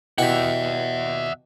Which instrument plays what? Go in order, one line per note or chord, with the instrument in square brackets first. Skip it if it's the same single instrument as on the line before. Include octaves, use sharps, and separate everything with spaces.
[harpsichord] B2 E4 G4 [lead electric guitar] E5 F#5